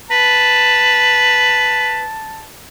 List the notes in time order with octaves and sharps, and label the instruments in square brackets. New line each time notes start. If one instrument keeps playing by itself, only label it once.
[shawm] B4 [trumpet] A5